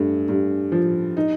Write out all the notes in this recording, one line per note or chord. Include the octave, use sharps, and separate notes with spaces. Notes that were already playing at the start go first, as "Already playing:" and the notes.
Already playing: G2 A3
G2
F3
D#4